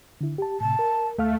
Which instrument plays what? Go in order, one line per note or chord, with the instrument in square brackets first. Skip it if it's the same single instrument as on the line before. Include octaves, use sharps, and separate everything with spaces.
[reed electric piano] D3 E4
G4 A5
[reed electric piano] A2 C3 [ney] A5
[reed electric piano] A#4
[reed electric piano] D2 F5 F6 [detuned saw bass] A3